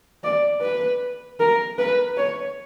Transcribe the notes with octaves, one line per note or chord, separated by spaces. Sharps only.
D5
B4
A#4
B4
C#5